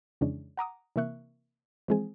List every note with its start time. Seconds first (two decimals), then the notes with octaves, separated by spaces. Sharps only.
0.21 F2 C#3 E3 G#3 C#4 D4
0.57 F#5 A#5 D6 D#6
0.96 C3 E3 A#3 E5 C#6 F#6
1.88 E3 F3 G#3 C4 G#4